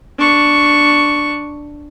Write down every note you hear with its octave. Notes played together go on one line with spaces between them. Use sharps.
D4 C#6